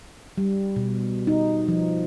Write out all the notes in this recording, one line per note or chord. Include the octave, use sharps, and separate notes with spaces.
G3
B2
D#4
F3